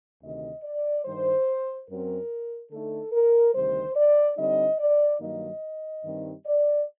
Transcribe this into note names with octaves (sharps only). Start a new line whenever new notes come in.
D2 C3 D#3 D#5
D5
G2 D#3 G3 C5
F#2 F#3 C4 A#4
D3 A3 D#4 A4
A#4
D2 C3 D#3 G3 C5
D5
D3 G3 C4 D#4 D#5
D5
G2 D#3 F#3 A#3 D#4 D#5
G2 D#3 G3 C4 D#4
D5